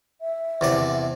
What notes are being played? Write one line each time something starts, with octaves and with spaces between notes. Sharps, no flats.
E5
E2 C3 D5